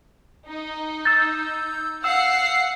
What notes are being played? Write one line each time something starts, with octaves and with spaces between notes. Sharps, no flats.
D#4
E6 G6 A6
F5 F#5 E6 C7